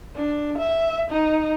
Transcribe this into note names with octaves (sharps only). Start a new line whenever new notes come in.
D4
E5
D#4